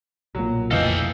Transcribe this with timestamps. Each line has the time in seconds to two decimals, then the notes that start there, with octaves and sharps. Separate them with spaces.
0.35 B1 A#2 F#3
0.71 F1 E3 A4 D#5 F5 G5